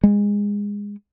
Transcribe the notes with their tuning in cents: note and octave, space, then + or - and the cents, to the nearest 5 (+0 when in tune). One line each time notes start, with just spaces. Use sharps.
G#3 -20